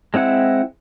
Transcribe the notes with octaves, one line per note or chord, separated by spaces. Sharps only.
G#3 C4 E4 F#5